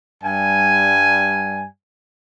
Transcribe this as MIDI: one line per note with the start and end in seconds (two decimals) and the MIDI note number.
0.24 1.66 43
0.24 1.66 55
0.24 1.66 80